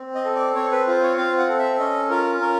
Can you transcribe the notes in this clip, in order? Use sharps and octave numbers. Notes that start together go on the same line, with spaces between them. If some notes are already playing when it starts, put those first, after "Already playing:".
Already playing: C4
D#5
A4
D5
C4 C#5
B4
F4 C5
C#5
C4 F5
F#5
A4
E5
C#4 D#5
F4 A#4
C#4 A#4